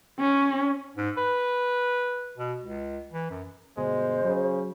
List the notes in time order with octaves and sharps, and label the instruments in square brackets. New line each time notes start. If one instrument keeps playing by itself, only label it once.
[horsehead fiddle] C#4
[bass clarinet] G#2
B4
B2
C#2
E3
F#2
[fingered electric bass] G1 B2 [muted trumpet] G#3 [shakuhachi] C5
[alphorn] C#3 [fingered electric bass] F#3